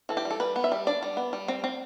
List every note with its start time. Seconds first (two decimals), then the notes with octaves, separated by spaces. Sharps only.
0.09 E3 A4
0.17 G4
0.25 G3
0.31 A4
0.40 G3 B4
0.56 B3
0.64 E5
0.72 G3
0.87 D4 D5
1.03 G3
1.17 B3
1.33 G3
1.48 C4
1.64 C4